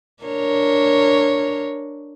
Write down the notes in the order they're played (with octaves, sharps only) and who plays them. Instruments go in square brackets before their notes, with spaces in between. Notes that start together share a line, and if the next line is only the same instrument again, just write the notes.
[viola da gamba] D4 A#4 C#5